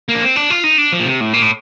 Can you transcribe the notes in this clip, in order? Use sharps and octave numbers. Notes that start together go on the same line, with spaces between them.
A#3
D4
C4
D4
F4
D#4
D4
F3
A#2
C3
A2
A#2
A2